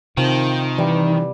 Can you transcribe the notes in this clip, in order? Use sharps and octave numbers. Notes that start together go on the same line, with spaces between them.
C3 D#3 F3 G5
E3 G3